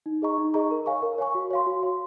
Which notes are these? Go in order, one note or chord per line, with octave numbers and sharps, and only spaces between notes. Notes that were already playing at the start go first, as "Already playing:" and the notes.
D#4
G#4 D#5 A#5 C#6
D#4
G#4 D#5 A#5 C#6
A#4
C#5 F5 G#5 C#6
A#4
C#5 F5 G#5 C#6
F#4
C#5 F5 C6
F#4
C#5 F5 C6